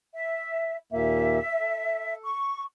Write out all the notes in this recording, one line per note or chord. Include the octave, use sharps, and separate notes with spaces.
E5
D#2 A#2 A#3 E5
A4
C#6